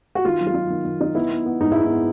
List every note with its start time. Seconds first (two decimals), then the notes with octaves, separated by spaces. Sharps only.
0.15 F#4
0.24 D#3 F4
0.40 F#3
0.47 F4
0.54 D#4
0.70 D#3
0.85 D#3
1.01 D#4
1.15 B3 E4
1.31 B3
1.46 B3
1.60 G#2 D#4
1.72 G#3 E4
1.84 D#4
1.92 B3